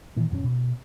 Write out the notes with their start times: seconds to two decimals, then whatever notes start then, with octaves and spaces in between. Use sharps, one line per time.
0.17 A#2 D#3 E3
0.31 E1 F#2 F3 C#4
0.44 B2